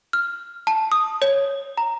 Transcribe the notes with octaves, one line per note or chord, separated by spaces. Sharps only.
F6
A5
D#6
C#5
A#5